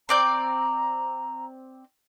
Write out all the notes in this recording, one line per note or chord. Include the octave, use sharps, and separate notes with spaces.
C4 D5 A#5 G6